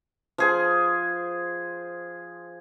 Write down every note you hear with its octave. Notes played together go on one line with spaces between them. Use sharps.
F3 G#4 C5